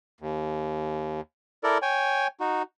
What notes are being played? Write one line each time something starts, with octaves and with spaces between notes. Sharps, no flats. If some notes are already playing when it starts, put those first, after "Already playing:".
D#2
E4 A4 A#4 D5
C#5 G5 G#5
D#4 F#4